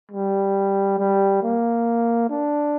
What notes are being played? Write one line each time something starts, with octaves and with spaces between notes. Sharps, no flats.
G3
G3
A#3
D4